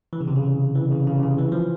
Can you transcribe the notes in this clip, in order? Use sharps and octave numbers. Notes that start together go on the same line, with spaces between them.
E3
C#3
C3
C#3
E3
C#3
C#3
C3
C#3
E3
F3